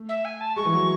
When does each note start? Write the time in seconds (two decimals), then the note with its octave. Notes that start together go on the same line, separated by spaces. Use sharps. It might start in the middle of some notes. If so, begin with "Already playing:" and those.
Already playing: A3
0.09 E5
0.25 G#5
0.40 A5
0.56 G#3 C#6
0.65 E3
0.73 F#3